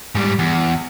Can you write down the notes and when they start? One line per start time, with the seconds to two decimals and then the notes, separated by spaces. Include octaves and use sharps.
0.15 G#2 G3
0.39 E2